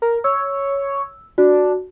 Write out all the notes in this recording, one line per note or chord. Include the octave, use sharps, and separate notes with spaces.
A#4
C#5 E6
D4 F#4